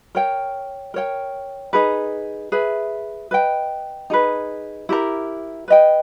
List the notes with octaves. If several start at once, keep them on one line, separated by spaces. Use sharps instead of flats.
A#4 C#5 G5
A#4 C#5 G5
D#4 G#4 B4
G#4 B4 E5
B4 D#5 G5
D#4 G#4 B4
E4 G4 A#4
B4 D#5 G5